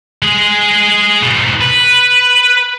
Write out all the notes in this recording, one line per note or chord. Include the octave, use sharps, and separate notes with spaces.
G#3 G#4
G#2 B2
B4